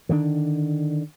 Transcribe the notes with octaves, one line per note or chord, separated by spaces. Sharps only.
D3 D#3 G3 D4